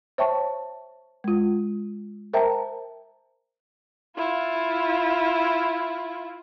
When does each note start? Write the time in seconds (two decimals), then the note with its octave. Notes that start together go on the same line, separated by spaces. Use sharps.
0.18 C5 C#5 E5 G5 A5 C#6
1.24 G#3 F4
2.33 A#4 C5 E5 G5 A5 A#5
4.16 E4 F4